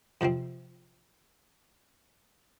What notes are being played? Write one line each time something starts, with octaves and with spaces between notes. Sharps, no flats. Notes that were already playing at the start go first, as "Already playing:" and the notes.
F2 C3 F3 C4